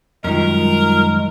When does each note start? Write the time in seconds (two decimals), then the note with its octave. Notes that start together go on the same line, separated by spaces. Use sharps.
0.24 F#2 D#3 G3 G#3 F4 A#4